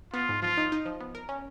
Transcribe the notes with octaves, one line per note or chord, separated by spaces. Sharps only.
B3 F4
G#2
F3 F4
D#4
D#4
F3
B3
A#4
C#4